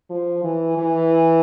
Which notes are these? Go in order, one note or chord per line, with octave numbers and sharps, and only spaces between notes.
F3
E3
E3